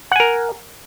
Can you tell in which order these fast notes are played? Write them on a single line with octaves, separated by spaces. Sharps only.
F#5 G#5 A#4